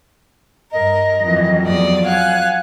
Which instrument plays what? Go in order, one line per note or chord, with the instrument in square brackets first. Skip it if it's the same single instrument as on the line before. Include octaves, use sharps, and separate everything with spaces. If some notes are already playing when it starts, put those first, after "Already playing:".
[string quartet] G2 A#4 [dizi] D#5
[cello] F2 F#3 [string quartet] E3
[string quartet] E2 D5 D#6
[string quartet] F5 G#5 F#6 [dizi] F#5